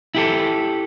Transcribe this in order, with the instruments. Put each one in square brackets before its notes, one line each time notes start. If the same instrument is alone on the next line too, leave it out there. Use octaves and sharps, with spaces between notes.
[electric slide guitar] E4 G4 A4